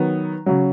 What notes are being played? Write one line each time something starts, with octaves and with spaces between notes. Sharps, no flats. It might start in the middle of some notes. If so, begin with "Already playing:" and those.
Already playing: D#3 F#3 B3
C#3 F#3